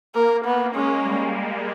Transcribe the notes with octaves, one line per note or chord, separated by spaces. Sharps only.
A#3 A#4
B3
G#3 C#4
G3